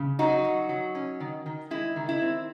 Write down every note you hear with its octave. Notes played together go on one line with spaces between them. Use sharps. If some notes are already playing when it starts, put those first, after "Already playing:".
Already playing: C#3
F#3 D#4 F#4
F#3
F#3
C#4
D#3
D#3
G#3 E4
D#3
E4
C4